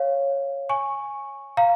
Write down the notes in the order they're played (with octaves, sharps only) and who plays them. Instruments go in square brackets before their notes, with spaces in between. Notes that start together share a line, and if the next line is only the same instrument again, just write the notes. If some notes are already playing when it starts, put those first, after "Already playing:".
Already playing: [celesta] C#5 F5
G#5 C#6
F5 A#5